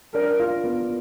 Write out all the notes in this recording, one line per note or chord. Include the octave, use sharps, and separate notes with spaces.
D4 A#4
F4
B3